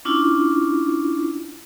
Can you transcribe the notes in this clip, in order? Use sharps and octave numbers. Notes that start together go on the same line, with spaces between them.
C#4 D4 E4 F4